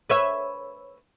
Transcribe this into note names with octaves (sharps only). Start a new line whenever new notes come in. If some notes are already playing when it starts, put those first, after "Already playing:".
B4 C#5 E5